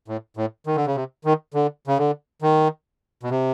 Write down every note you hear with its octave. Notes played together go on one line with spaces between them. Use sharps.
A2
A2
D#3
D3
C#3
C3
D#3
D3
C#3
D3
D#3
B2
C3